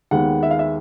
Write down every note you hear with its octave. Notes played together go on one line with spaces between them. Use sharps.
D#2 D#3 G#3 B3 F#5
E5
F5
E5